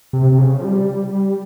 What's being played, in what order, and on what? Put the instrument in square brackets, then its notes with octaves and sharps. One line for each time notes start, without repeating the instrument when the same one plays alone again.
[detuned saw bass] C3
C3
C#3
F3
G3